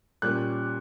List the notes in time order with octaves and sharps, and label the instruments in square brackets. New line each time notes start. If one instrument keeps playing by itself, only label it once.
[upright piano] A#2 G3 C#4 F#6